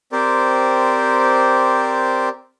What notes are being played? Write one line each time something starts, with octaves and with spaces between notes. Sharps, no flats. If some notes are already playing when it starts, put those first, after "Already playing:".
C4 G4 A#4 C5 D5